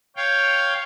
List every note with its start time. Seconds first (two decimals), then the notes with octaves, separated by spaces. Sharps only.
0.16 C#5 F5 G5